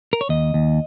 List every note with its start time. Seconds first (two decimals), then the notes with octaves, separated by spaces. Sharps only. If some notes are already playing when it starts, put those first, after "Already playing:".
0.13 A#4
0.21 C#5
0.29 D#2 D#5
0.54 D#2